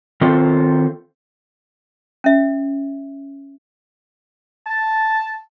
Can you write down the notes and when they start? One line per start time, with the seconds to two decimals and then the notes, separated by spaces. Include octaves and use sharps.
0.21 D#3 C4 F4 A4 C5
2.24 C#4 E5
4.67 A5